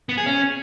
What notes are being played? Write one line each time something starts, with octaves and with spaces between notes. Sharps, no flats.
B3
G#4
C#4